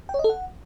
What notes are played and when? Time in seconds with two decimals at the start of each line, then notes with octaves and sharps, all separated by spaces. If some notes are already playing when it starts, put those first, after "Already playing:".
0.09 G5
0.14 C#5
0.19 D#5
0.24 A4
0.29 F#5